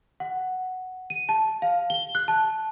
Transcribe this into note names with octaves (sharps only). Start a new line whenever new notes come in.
F#5
D#7
A5
F5
G7
F#6
A5